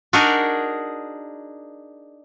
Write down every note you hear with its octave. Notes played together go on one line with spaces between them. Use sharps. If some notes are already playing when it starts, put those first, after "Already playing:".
D4 D#4 F#4 G#4 A#4